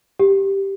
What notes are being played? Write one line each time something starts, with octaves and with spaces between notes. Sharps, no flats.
G4